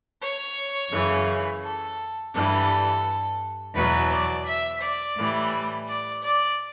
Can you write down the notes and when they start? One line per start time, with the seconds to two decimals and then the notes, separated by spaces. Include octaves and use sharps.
0.20 C#5
0.91 F#2 C#3 E3
1.62 A4
2.32 G2 E3 G3 A4
3.74 E2 B2 F#3 B4
4.10 D5
4.45 E5
4.81 D5
5.16 A2 E3 G3
5.87 D5
6.23 D5